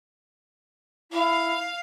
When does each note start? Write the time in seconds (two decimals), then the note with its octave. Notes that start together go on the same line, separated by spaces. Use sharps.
1.11 E4 F5